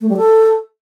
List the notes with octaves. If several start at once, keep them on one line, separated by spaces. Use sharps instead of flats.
A3
G3
A4